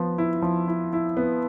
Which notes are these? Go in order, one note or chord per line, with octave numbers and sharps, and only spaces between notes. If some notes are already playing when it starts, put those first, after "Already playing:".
Already playing: F3 B3
E4
F3
E4
E4
B3